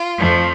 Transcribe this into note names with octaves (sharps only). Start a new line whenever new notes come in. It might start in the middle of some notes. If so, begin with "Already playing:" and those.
Already playing: F4
F2 F3 A3